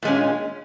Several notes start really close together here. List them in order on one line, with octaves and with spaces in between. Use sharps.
A#2 G#3 C#4